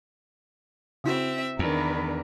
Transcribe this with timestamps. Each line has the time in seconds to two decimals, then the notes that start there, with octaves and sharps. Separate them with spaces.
1.04 C#3 C4 E4 F#4 E5
1.59 E2 D#3 D4 A#4 B4